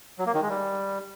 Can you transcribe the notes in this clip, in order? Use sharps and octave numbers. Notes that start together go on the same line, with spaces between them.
F#3
A#3
D#3
G#3
G3